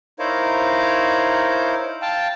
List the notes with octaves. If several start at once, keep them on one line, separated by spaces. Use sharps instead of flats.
D#4 E4 A#4 C5 C#5 F5
F5 G5 A5